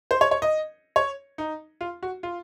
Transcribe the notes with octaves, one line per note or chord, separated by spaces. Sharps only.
C5
C#5
C#5
D#5
C#5
D#4
F4
F#4
F4